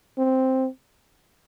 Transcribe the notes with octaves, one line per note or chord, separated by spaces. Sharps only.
C4